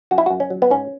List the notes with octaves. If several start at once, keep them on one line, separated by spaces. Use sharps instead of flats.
F#2 F#4
E4
F#2 F#4
C#4
F#3
B3
G#2 C#4